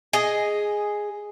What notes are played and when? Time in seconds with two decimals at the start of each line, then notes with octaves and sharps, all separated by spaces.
0.13 G#4 D#5